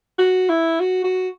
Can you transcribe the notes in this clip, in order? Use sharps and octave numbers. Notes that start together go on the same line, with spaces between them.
F#4
E4
F#4
F#4